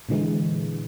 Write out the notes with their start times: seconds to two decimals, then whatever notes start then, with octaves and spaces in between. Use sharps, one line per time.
0.09 A#2 D3 E3 G#3